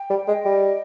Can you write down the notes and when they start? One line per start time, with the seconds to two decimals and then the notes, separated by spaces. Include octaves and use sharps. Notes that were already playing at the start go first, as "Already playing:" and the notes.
Already playing: G5
0.10 G3
0.28 G#3 D#5
0.45 G3
0.64 G5